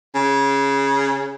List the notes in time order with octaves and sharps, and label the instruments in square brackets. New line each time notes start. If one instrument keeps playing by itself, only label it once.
[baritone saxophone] C#3